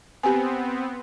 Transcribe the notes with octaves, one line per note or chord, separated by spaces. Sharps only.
B3 C4 G4 G#5